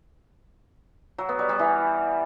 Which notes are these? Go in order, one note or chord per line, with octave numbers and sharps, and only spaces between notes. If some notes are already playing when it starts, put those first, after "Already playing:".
F#3
B3
G3
G3
E3